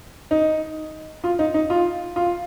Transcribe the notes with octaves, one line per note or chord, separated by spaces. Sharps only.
D#4
F4
D#4
D#4
F4
F4